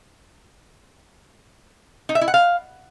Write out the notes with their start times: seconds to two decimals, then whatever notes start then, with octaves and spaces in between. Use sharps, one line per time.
2.09 D#4
2.15 E5
2.21 E4
2.28 F#5
2.34 F5